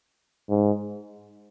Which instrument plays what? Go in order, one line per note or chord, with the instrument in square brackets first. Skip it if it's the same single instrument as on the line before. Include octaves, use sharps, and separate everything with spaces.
[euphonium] G#2